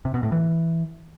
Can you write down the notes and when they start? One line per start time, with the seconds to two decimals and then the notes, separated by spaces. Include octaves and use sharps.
0.05 C3
0.14 B2
0.23 A2
0.32 E3